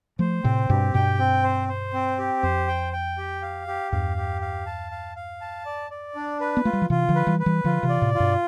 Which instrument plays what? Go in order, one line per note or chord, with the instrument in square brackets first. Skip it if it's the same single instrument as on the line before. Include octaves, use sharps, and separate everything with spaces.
[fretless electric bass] F3 A3 [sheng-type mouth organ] C5
[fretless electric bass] A2 C3 [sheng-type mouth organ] C4
[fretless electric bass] G2 B2 [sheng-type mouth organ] G4
[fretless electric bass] G2 B2 [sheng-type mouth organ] G5
[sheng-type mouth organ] C4
C5
C5
C4
G4
[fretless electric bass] F2 [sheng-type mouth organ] C5
[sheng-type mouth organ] G5
G5
G4
F5
G4
[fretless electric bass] E2 G2 [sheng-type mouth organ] F5
[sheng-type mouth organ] G4
F5
A5
F5
F5
A5
D5
D5
D4
B4
[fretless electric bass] B3
[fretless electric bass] A3 [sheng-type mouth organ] F4
[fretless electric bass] G3
F3
[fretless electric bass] C3 E3 [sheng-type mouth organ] F4
[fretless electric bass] D3 F3
[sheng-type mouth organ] B4
[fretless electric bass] E3 G3
[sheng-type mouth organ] B4
[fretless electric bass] E3 G3
[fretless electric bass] D3 F3 [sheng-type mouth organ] F4
[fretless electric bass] C3 E3
[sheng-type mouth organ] D5
[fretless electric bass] A2 C3
[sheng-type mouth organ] F4
[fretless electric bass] G2 B2